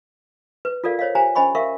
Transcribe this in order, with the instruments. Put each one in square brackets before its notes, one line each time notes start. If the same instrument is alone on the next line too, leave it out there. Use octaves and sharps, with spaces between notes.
[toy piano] B4
F4 A4 A#4 D5 F5
C5 C#5 D#5 F5
G4 C5 F5 G#5 A#5
C#4 C5 D#5 G#5 B5 C#6
A#4 E5 F5 C#6